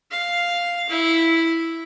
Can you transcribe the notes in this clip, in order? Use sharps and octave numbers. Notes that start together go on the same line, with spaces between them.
F5
E4